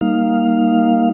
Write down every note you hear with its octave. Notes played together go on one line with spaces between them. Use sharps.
G3 A#3 D#4 F5